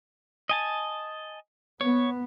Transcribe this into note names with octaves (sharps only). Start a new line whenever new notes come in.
D#5 G#5 A5
B3 C#5